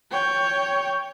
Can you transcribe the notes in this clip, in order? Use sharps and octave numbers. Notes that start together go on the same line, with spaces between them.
C#5 G5